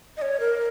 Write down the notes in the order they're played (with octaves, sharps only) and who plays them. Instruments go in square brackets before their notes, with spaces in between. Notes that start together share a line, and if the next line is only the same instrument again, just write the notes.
[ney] D#5
C#5
A#4